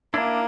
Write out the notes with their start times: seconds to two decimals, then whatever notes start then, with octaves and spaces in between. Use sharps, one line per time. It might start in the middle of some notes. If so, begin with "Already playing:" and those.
0.14 A#3 D4 E4